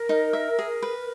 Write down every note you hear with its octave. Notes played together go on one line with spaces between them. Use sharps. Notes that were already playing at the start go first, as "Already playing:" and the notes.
Already playing: A#4
D#4
E5
G#4
B4